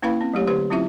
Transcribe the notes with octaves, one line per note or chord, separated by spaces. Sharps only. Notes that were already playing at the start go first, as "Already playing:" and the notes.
A#3 C#4 E4 B4 F5 B5
C4
F#3 A3 G4 C#5
D3 G4 B4 C5
F#3 C4 C#4 E4 F4 E5